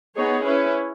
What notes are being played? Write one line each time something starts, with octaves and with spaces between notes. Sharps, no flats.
B3 D#4 G#4 C#5
C#4 E4 B4